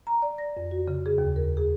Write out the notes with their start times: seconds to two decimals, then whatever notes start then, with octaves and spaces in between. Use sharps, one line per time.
0.07 A#5
0.22 D5
0.38 A#6
0.57 F2
0.71 F#4
0.88 C#3
1.06 G#4
1.18 D#2
1.36 A#4
1.57 G#4